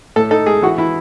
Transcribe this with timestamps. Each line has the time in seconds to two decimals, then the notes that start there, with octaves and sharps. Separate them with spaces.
0.16 A2 A4
0.31 D#4 A4
0.46 G#3 G#4
0.62 E3 F#4
0.78 E3 E4